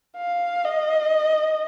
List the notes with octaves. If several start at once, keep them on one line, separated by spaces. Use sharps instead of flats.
F5
D#5